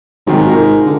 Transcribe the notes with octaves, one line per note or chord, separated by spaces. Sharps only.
G#2 C3 D#3 F#3
F4 A#4
D3